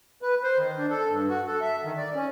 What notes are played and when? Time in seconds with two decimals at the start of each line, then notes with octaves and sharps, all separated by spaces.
0.22 B4
0.43 C5
0.58 D#3
0.78 D4
0.90 A4
1.09 G2
1.30 F#4
1.47 A4
1.61 E5
1.84 D#3
1.97 D5
2.15 C#4